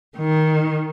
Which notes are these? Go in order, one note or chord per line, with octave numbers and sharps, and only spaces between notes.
D#3